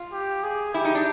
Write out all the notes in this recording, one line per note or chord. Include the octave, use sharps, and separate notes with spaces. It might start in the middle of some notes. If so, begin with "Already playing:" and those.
Already playing: F4
G4
G#4
E4 G4
D#4
D4